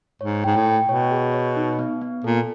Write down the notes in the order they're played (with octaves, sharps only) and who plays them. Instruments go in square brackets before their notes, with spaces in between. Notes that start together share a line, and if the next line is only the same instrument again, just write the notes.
[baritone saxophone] G#2 [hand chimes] C#5
[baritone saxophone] G#2 [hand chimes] G5
[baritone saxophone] A2
[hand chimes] G5
[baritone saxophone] B2 [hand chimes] C#5
[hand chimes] G#4
C#5
D#4
B3
B3
[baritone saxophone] A#2 [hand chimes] A4